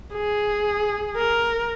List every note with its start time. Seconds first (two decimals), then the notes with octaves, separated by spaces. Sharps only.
0.14 G#4
1.17 A#4